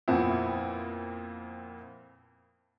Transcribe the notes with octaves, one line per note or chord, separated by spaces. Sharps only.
F2 A#2 B3 C4 E4